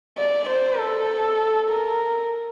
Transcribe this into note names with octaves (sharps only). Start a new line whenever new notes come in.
D5
C5
A4
A#4